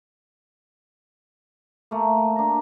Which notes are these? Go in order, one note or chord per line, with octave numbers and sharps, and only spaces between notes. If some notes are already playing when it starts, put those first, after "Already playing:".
A3 A#3
D4 A#5